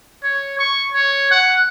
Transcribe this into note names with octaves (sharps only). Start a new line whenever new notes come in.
C#5
C#6
C#5
F#5